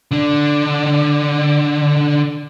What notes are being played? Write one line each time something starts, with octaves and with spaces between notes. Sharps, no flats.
D3 D4